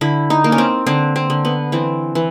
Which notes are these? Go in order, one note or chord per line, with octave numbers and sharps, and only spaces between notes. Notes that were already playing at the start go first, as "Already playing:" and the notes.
D3 E4
D#4
A#3
C#4
C4
D3 C4
C4
D3
B3
E3 C4
E3